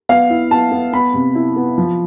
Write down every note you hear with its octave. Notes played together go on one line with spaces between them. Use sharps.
B3 F5
E4
B3 A5
B3
B3 B5
C3
E4
B3
F3